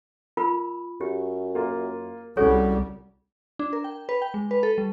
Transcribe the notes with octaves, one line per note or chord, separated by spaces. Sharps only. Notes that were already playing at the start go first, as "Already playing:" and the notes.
F4 A#4 B5
F#2 G4
A#3 F4
C2 G3 C#4 F#4 G#4 A4 C#5
D4
A#4
G5
B4
G5
G#3
B4
A4
G3